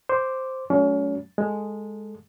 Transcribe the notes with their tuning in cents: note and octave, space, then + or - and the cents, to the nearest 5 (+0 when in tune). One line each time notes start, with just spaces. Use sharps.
C5 +0 D6 -5
F#3 +0 A3 -30 C#4 +35
G#3 +0 A4 +0